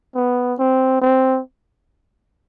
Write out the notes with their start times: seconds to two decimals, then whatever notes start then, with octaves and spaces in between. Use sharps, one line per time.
0.15 B3
0.59 C4
1.02 C4